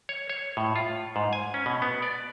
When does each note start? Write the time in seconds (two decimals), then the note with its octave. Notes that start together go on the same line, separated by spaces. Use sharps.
0.09 C#5
0.30 C#5
0.57 A2
0.76 F4
1.16 G#2
1.33 G#5
1.54 C#4
1.66 B2
1.82 B3
2.02 D5